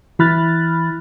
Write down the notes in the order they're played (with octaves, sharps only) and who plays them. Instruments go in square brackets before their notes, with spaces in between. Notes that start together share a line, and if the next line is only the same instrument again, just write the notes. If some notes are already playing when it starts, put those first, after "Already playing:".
[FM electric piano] E3 E4 B5 F6 F#6 A6